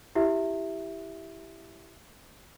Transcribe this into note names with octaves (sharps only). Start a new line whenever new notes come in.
E4 G4 E5